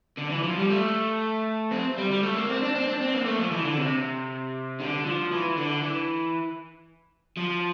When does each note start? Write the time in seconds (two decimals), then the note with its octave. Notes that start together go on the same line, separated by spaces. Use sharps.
0.18 D3
0.30 E3
0.44 F3
0.57 G3
0.70 A3
1.72 C4
1.98 G3
2.11 G3
2.23 A3
2.36 A#3
2.49 C4
2.62 D4
2.75 C4
2.88 D4
3.01 C4
3.13 A#3
3.26 A3
3.39 F3
3.51 E3
3.65 D3
3.77 C3
4.80 D3
5.06 F3
5.32 E3
5.58 D3
5.83 E3
7.37 F3